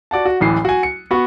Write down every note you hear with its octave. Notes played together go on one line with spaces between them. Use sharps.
F#4 D5 F#5 A5
F#4
D1 A1 E3 C7
F#4 G#5
C#7
B3 F#4 C#6